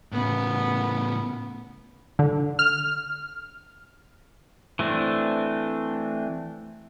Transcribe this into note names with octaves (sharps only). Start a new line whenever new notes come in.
A2 C#3 B3
D3
F6
E3 A3 C4 D4